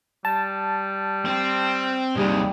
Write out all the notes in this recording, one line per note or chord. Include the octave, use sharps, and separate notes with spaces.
G3 A5
C4
D#2 C3 G3 G#4